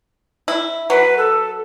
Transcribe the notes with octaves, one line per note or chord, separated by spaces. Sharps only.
E4
F#3 B4
A4